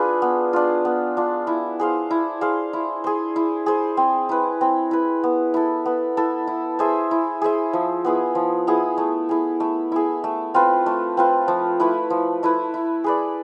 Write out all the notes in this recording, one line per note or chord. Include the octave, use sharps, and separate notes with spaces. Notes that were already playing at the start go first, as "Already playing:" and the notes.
Already playing: D4 F4 G#4 B4
B3
D4 F4
B3
D4 F4
E4
G#4 C5 F5
E4
G#4 C5 F5
E4
G#4 C5
E4
G#4 C5
C4
E4 B4
C4
E4 B4
B3
E4 A4
B3
E4 A4
E4
G#4 C5 E5
E4
G#4 C5 E5
F3
B3 E4 G#4
F3
B3 E4 G#4
A3
E4 G#4
A3
E4 G#4
A3
C4 F4 B4
A3
C4 F4 B4
F3
A3 E4 B4
F3
A3 E4 B4
E4
G#4 B4 D5